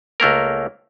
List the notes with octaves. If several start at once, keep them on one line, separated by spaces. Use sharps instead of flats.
C#2 A3 A#3 A#4